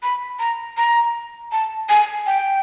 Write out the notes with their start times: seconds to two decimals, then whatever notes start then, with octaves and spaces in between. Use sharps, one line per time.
0.03 B5
0.39 A#5
0.77 A#5
1.52 A5
1.89 G#5
2.26 G5